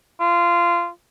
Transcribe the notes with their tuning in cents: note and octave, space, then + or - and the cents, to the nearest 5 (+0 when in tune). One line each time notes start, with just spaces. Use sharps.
F4 -20